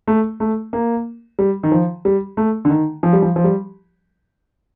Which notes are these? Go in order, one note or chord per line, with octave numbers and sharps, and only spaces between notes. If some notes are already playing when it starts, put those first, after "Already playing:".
A3
A3
A#3
G3
D#3
F3
G3
A3
D3
D#3
F3
G3
F3
F3
G3